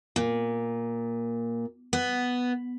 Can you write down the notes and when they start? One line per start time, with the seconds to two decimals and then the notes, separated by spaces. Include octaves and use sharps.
0.16 A#2
1.93 B3